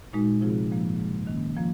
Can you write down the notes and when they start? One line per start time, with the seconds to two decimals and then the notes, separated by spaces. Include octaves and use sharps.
0.13 A#2 G#3 D#4 F#4
0.41 C3 F3 C4 F4 G#4
0.71 G#2 F3 A#3
0.99 F#2 C#3 G#3
1.27 D#3 A#3 C#4
1.56 F3 A#3 F4